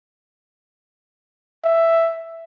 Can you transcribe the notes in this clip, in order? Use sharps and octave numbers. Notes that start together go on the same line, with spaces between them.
E5